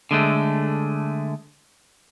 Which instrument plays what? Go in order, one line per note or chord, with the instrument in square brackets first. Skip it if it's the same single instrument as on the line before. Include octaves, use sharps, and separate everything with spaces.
[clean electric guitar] D3 G#3 A3